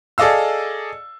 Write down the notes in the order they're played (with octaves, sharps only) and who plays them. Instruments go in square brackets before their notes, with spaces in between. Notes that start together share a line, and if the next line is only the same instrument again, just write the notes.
[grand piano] G#4 A4 D5 D#5 F5 E6